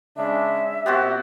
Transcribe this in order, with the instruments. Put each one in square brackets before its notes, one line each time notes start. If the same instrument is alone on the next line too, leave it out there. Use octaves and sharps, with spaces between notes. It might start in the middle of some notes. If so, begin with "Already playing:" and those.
[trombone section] C#3 G#3 D4 [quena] E5
[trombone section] A#2 G4 [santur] B3 C4 F#4